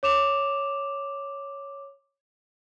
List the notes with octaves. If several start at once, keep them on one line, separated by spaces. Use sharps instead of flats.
C#5 D6 E7 F7